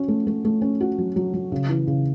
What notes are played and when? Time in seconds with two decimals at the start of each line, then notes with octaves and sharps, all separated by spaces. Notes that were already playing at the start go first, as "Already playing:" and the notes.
Already playing: C#4 F#4
0.08 A3
0.27 A3
0.45 A3
0.62 C#4
0.80 F#4
0.98 F#3
1.16 F#3
1.34 F#3
1.52 C#3
1.69 E3
1.87 C#3